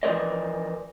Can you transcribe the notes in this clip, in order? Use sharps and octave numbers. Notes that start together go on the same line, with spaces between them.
E3 F3 B3 A#4 D5 D#5